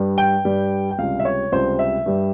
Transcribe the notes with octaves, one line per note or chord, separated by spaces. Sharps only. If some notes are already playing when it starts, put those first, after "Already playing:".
Already playing: G2 G3
G5
G2 G3
G5
C#2 C3 G3 F5
E5
C#5
C#2 C3 G3 C5
E5
G2 G3